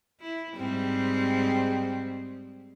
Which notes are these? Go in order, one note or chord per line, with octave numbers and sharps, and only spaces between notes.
E4
G#2 G3 C4